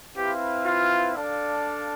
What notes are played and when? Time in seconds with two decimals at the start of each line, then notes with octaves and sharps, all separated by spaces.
0.16 C4 E4 G4 B4 F5
0.66 F4
1.16 D4 A4 D5 F5